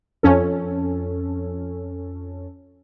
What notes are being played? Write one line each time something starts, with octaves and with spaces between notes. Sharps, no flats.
F2 C#4 A4